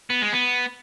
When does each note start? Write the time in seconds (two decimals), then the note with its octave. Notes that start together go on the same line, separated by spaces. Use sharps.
0.10 B3
0.21 G#3
0.32 B3